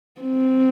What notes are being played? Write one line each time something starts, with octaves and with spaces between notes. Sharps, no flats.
C4